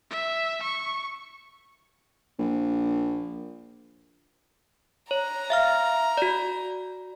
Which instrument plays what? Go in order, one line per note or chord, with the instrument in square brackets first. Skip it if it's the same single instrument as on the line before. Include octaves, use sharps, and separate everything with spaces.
[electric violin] E5
C#6
[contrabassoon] A#1
[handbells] C#5 [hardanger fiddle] A#5
[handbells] E5 F5 F6
F#4 D5